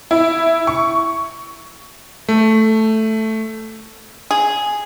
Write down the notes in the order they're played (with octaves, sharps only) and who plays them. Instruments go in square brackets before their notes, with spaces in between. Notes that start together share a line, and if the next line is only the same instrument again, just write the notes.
[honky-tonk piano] E4
C#6
[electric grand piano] A3
[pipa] G#4